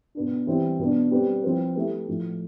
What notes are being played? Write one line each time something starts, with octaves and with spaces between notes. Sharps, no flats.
B2 B3 D4
E3 G3 C4 G4
B2 B3 D4
G3 C4 G4 B4
F3 C4 E4 B4
A3 E4 G4 B4
A2 F3 A3 E4